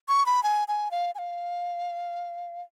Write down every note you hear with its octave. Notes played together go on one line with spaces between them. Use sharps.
C#6
B5
G#5
G#5
F5
G#5
F5